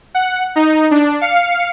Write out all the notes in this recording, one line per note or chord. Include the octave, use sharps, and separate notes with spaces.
F#5
D#4
D4
F5 C#7